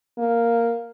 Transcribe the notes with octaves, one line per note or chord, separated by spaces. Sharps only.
A#3